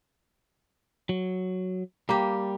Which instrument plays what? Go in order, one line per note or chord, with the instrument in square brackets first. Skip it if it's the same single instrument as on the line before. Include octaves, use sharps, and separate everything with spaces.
[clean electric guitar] F#3
[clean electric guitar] G3 [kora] A#3 G4